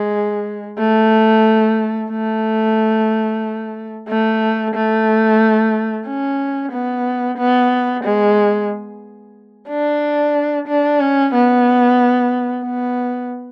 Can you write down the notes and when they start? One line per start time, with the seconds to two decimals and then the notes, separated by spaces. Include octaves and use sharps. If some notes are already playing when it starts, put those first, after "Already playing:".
Already playing: G#3
0.79 A3
2.10 A3
4.08 A3
4.74 A3
6.06 C#4
6.72 B3
7.37 B3
8.04 G#3
9.69 D4
10.67 D4
11.00 C#4
11.34 B3
12.65 B3